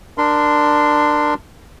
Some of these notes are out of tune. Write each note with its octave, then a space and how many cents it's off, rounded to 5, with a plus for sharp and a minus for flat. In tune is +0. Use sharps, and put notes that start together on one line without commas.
D4 +15 A#4 +0 C6 -20